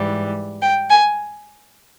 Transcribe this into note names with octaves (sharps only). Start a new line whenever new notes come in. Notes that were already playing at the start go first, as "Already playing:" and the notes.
Already playing: G#2 E3 G3
G5
G#5